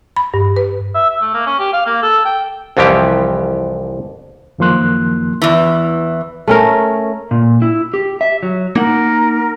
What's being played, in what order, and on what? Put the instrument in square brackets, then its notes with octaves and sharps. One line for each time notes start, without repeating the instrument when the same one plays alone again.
[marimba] B5
G2
B4
[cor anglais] E5
E5
A3
A#3
C#4
G4
F5
A#3
A4
G5
[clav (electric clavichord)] C2 F2 E3 F3 G4
[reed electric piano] F#2 D#3 F3 A#3 C6 F#6
[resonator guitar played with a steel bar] E2 E3
[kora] A3 C#4 A#4
[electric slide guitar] A#2
E4
G4
E5
F#3
[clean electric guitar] A#3 D#4 F#5 [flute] A#4